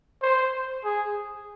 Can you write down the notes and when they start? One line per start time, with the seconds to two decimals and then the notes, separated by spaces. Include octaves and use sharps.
0.22 C5
0.84 G#4